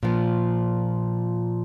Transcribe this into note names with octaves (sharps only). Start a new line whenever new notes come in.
A#2 F3